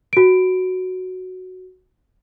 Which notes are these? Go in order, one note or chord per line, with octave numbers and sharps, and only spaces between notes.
F#4 D7